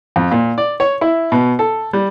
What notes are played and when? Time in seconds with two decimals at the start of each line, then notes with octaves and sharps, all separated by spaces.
0.16 F2
0.32 A#2
0.58 D5
0.80 C#5
1.01 E4
1.32 B2
1.59 A4
1.93 G3